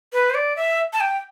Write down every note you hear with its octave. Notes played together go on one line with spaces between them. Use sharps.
B4
C5
D5
E5
A5
G5